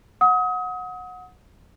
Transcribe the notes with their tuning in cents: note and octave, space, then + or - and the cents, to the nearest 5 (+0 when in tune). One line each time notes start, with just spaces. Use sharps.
F#5 -20 D#6 +35